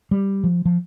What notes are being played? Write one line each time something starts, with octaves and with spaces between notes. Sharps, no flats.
G3
F3
F3